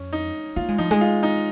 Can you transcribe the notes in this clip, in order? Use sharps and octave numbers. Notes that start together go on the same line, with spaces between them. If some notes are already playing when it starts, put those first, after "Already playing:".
Already playing: F2 C#4
D#4
A#3 F4
G#3
F3 D#4
G#3
F4
D#4